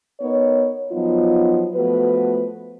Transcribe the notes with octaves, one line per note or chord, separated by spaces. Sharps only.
B3 D#4 A#4 C#5
F3 F#3 B3 D#4 F4
F3 A3 B3 F#4 B4